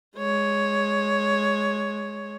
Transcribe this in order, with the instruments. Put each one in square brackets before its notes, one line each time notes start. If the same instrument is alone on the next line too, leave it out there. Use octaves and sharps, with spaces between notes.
[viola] G#3 C#5